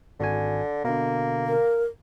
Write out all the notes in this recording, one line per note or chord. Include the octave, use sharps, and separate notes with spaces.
G#1 D3 F#4 G#5
B2 D3 A#3
A#4